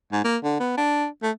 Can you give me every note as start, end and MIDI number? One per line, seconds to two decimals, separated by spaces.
0.12 0.22 44
0.24 0.37 58
0.43 0.59 50
0.60 0.76 59
0.77 1.06 62
1.23 1.31 57